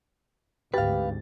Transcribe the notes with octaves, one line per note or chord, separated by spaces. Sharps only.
G#1 D2 G#2 G4 B4 F5 A6